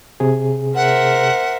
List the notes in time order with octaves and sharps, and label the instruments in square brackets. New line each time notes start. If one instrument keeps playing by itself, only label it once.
[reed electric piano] C3 G#4
[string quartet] A#4 C5 E5 [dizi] F#5